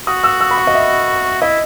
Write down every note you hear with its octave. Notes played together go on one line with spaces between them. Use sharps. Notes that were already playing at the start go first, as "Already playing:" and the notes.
F#4 D#6
E6
E6
B5
C#6
D#5
E5
E4 D#5